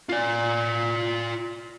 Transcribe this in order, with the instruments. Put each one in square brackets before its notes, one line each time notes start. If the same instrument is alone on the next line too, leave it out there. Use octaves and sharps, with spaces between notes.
[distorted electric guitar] F4 D5